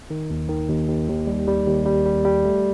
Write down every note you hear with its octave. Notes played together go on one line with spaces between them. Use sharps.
D#3
D#2
D#3
D#2
D#2
D#2
G3
G3
D#2
G3
G3
G3
A3